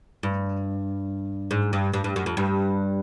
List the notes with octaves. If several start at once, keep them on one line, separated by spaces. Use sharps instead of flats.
G2
G#2
G2
G2
G2
F#2
F2
G2